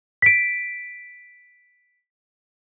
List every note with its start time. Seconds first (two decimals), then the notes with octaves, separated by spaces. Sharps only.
0.22 B6 D7